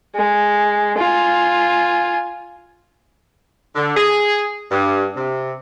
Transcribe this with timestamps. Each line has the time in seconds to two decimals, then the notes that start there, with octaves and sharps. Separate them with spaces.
0.16 G#3
0.98 F4 G#5
3.76 D3
3.96 G#4
4.71 G2
5.16 C3